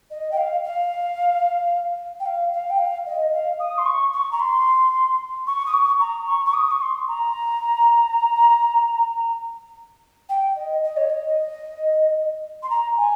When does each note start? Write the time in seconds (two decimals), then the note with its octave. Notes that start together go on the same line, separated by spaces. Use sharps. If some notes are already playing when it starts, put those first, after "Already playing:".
0.10 D#5
0.31 G5
0.37 F5
0.64 F5
2.20 G5
2.26 F5
2.52 F5
2.70 G5
2.79 F5
3.06 D#5
3.32 F5
3.60 D#6
3.78 C6
3.86 C#6
4.13 C#6
4.31 A#5
4.39 C6
5.47 C#6
5.66 D#6
5.73 C#6
6.00 A#5
6.27 C#6
6.45 C#6
6.54 D#6
6.71 C#6
6.81 C6
7.08 A#5
10.29 G5
10.56 D#5
10.83 D#5
10.97 C#5
11.10 D#5
12.63 C6
12.70 A#5
12.97 G#5